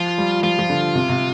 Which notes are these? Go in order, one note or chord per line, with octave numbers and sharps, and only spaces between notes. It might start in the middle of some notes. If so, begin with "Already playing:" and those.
Already playing: F3 F4
G3
F3 F4
F3
D3
C3
C3